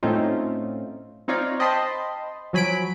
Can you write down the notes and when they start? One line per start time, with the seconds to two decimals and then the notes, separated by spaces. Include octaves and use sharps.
0.03 A2 A3 C4 C#4 D#4 F4
1.28 C4 D#4 F4 C#5 D5 F5
1.59 C5 D#5 G5 A5 B5 C6
2.53 F3 F#3 G#5 B5 B6 D7